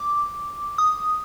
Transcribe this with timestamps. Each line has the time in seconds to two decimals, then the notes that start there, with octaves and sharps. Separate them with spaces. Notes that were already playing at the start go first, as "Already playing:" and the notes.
Already playing: D6
0.78 D#6